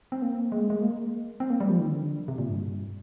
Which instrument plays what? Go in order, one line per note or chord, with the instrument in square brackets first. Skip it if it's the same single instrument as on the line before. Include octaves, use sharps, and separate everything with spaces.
[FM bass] C4
A#3
G#3
G#3
A#3
C4
A#3
G3
F3
D#3
D3
C3
A#2
G2